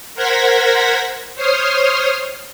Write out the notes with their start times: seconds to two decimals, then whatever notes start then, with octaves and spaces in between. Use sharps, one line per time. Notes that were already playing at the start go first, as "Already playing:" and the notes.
0.15 A#4 C5 F#5 G#6 A#6 B6
1.35 C5 C#5 C6 D#6 F6